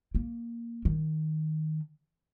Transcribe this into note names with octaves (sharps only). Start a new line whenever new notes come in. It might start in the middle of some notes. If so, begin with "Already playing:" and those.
A#3
D#3